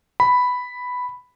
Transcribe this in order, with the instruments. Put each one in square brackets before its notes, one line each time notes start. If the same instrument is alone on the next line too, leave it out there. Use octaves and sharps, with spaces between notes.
[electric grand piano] B5